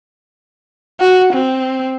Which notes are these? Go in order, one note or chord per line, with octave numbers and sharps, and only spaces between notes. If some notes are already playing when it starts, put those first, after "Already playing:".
F#4
C4